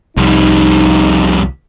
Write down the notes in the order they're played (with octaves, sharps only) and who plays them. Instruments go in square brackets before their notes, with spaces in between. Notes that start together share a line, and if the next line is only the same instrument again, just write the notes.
[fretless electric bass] C2 [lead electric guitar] F2 G3 [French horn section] D#4